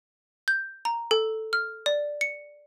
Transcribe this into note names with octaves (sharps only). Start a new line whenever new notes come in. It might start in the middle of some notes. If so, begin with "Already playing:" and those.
G6
A#5
A4
F6
D5
C#7